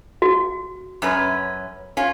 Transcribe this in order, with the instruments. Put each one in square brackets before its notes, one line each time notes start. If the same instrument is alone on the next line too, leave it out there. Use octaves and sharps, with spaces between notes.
[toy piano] F#4
[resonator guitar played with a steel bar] F#2 C#4 B4
C#4 F4